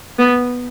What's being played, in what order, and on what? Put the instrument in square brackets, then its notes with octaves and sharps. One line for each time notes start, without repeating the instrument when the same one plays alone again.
[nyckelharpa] B3